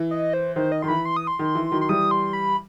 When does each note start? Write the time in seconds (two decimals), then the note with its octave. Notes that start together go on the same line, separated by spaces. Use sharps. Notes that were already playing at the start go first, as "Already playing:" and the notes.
Already playing: E3
0.11 D#5
0.34 C5
0.56 D#3 C5
0.72 D#5
0.82 D#3 C6
0.88 E3 B5
1.05 C6
1.17 D#6
1.27 C6
1.39 D#3
1.55 E3
1.72 D#3 F#3
1.81 C6
1.89 E3 G3 D#6
2.11 C6
2.33 B5